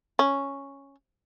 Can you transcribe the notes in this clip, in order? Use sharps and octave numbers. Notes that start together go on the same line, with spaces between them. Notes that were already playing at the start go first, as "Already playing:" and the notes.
C#4